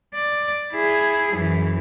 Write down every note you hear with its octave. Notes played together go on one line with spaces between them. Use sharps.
D5
E4 G#4
F#2 E3